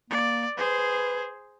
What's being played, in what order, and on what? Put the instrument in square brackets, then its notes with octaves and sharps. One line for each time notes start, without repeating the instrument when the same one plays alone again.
[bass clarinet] A#3 [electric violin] D5
[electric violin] G#4 C5 [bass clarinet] B4